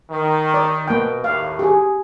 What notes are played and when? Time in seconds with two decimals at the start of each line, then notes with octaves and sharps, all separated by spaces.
0.10 D#3
0.54 D5
0.88 B2 A#3 G5
1.24 D#2 A2 F5
1.59 G4 G#4